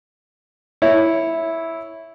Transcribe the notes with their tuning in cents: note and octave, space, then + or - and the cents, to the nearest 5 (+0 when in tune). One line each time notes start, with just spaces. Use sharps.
E4 -5 C#5 +0